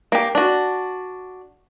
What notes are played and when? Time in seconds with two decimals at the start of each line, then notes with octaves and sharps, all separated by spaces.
0.12 A#3 G4
0.35 D4 F#4